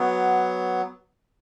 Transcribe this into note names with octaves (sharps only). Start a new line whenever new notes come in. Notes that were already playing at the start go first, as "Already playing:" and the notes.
Already playing: F#3 B3